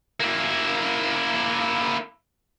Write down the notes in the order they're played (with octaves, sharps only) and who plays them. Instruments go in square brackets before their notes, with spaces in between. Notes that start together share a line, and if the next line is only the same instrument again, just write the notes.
[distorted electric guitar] A#3 E4